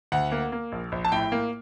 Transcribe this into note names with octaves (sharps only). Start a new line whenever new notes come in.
D2 F#5
A#3
A#3
A#1
A#1
A5
A2 G5
A#3